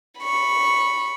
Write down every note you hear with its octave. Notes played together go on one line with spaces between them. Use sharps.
B5 C#6